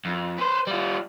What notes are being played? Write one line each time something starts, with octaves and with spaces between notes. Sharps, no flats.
F2
B4 C5
G3 F4